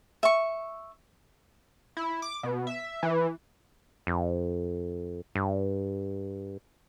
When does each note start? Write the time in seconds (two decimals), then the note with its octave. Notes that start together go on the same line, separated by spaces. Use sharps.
0.23 E5 C#6
1.97 E4
2.22 D6
2.43 B2
2.67 E5
3.03 E3
4.07 F2
5.35 G2